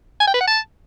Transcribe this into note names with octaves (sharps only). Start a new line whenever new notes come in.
G#5
G5
B4
F#5
A5